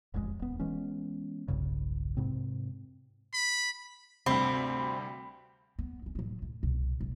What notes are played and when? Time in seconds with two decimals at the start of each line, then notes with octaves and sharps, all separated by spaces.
0.14 E1 A1 F2 G#3
0.39 D#1 B3
0.60 E3 G#3 B3 C#4
1.48 E1 B1 G2 C#3
2.17 G#2 C3 C4
3.33 B5
4.26 D2 G2 C3 C4 B5
5.79 B3
6.02 D#2 C#4
6.15 A2 F#3
6.42 A2
6.63 C2 B2
7.00 D#1 E2